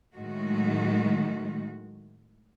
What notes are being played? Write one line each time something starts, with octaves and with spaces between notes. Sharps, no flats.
A2 D#3 F#3 G#3 A3 F#4